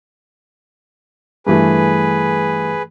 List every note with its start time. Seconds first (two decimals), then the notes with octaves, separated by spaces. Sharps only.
1.47 G2 E3 A3 G#4 B4